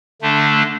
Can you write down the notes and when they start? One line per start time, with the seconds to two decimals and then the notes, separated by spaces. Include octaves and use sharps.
0.22 D3 A3 D4